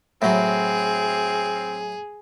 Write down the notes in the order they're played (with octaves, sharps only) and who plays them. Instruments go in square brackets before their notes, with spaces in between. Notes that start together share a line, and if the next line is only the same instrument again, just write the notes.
[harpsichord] A2 F#3 [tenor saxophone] C4 [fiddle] G#4